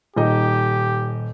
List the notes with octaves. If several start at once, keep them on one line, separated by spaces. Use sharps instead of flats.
D#1 D#4 G4 D#5